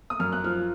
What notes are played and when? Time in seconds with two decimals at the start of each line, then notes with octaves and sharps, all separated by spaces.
0.10 D#6
0.20 F#2 F6
0.32 F#6
0.44 F3 F6